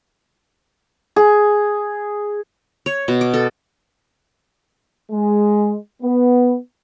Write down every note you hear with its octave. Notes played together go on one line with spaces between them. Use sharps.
G#4
C#5
B2
D6
A4
G#3
B3